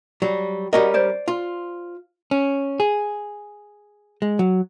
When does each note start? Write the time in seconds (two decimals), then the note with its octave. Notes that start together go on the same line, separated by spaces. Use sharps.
0.22 F#3 G3
0.73 G3 C#4 F#4 A#4 D#5
0.94 C5 D5
1.28 F4
2.31 C#4
2.80 G#4
4.22 G#3
4.39 F#3